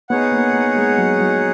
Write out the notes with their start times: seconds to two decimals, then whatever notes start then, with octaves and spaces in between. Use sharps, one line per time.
0.10 B3 D#4 G#4 C#5 F#5
0.32 A#3
0.53 A#3
0.76 G#3
0.98 F#3
1.20 F#3